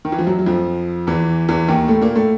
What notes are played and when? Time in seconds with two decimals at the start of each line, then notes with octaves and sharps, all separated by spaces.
0.05 D#3
0.12 E3
0.19 F3
0.27 F#2 F#3
0.39 F#3
0.46 F2 F3
1.07 E2 E3
1.49 E2 E3
1.68 D#2 D#3
1.88 A2 A3
2.02 A#2 A#3
2.16 A2 A3